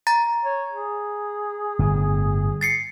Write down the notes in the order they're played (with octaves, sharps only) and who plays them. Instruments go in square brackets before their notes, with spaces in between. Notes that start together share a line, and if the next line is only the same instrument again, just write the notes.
[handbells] A#5 A6
[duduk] C#5
G#4
[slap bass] G1 A2
[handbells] A6 C7 C#7